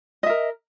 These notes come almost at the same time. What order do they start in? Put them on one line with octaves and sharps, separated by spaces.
D#5 E5 A#4